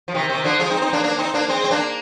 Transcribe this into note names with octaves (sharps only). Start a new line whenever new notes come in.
F3
C3 D#3
C3 D#3
D3 F3
F3 G#3
C4 D#4
C4 D#4
A#3 D4
A#3 D4
C4 D#4
A#3 D4
G#3 C4
C4
A#3 D4